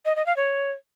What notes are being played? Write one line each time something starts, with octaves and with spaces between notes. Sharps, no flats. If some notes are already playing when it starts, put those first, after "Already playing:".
D#5
D#5
F5
C#5